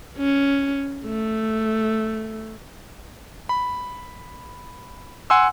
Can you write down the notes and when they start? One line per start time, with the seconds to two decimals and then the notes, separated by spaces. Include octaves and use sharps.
0.18 C#4
1.06 A3
3.49 B5
5.30 F#5 G#5 C6 E6